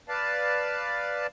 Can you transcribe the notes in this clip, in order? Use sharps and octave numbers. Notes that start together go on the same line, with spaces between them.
B4 D5 F5 A5